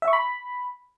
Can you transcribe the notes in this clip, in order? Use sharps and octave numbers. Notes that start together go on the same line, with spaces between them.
E5
C#6
B5